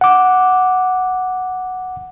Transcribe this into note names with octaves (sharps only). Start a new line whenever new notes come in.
F#5 D6